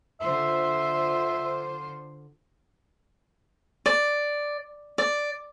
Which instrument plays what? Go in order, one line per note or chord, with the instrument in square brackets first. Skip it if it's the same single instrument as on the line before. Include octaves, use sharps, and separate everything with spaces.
[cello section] D3 F4 C5 [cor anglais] E5
[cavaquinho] D5
D5